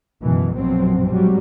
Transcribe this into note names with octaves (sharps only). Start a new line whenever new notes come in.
C#2 F#2 B2 D#3 E3
A#1 F#2 B2 F3 F#3 C4
G#2 F#3 G3